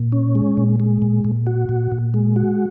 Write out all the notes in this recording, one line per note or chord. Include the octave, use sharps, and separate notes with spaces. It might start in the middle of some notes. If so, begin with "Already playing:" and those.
Already playing: A#2
C#4
G#3
A#2
G#3
A#2
A#2
F#4
A#2
A#2
G#3
F#4